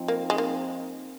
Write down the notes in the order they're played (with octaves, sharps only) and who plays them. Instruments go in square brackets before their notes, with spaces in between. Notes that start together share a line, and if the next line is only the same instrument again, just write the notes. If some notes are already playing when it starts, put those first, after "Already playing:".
Already playing: [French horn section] F3 C4 D#4
[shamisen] A#3
G#3
A#3